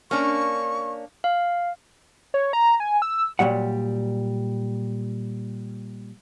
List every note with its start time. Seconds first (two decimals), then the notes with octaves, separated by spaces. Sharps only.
0.11 A#3 C#4 D4 C#6
1.24 F5
2.34 C#5
2.53 A#5
2.80 G#5
3.02 E6
3.39 A#2 F#3 G3 F#5